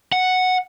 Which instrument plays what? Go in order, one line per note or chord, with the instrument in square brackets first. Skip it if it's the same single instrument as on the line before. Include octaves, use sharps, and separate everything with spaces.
[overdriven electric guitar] F#5